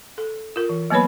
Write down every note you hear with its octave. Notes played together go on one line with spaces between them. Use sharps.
A4
F4 A#4
E3
F#3 A#3 B3 B4 C#5 B5